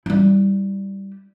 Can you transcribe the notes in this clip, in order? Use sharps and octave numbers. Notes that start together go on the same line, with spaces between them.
G3 E4